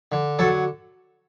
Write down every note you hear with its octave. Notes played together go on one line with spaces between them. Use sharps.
D3
F#3 A4